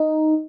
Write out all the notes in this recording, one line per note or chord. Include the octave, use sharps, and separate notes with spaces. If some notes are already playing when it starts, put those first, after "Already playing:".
Already playing: D#4